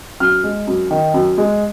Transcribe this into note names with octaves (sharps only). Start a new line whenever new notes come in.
F#2 F6
G#3
F#2
D#3
F#2
G#3